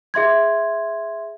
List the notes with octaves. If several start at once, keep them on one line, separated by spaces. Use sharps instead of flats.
G#4 E5 C6 G#6